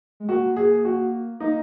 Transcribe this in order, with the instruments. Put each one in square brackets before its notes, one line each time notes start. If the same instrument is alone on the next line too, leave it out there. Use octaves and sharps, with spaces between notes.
[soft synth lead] G#3
[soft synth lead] A#3 [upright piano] F#4
[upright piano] G#4
F#4
[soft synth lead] A#3 [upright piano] D#4